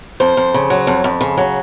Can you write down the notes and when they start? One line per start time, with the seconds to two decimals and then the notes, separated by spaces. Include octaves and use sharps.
0.20 F2 C5
0.37 F2
0.54 C#3
0.70 F#3
0.87 F2
1.04 F2
1.21 C#3
1.37 F#3